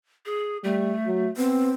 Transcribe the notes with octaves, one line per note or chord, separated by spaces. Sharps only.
G#4
G3 A3
F#3
B3 C4